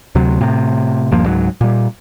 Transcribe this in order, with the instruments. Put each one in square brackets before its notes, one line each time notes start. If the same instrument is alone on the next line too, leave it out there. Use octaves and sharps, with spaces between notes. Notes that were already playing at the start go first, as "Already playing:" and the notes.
[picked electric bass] D2 C3 F#3
A2 C3
D#1 G2 F3 A#3
C#2 G#2 F#3
A#2 G3